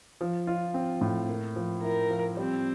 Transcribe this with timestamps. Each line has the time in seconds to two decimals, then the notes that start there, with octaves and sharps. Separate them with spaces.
0.21 F3
0.47 F4
0.74 C4
1.01 A2
1.29 A#3
1.56 F3
1.83 E4 A#4
2.09 F3
2.37 G3 C4